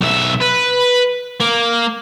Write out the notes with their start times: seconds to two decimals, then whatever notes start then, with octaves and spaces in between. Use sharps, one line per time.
0.01 B1 E5
0.40 B4
1.40 A#3